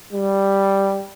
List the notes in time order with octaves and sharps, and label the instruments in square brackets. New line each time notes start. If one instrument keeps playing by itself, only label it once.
[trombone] G3